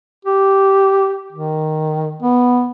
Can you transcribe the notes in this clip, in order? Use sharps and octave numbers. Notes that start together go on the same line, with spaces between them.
G4
D#3
B3